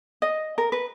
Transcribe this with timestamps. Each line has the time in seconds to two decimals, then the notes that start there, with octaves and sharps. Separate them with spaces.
0.22 D#5
0.58 A#4
0.72 B4